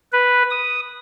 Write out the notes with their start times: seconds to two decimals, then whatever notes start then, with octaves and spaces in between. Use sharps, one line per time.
0.13 B4
0.51 D#6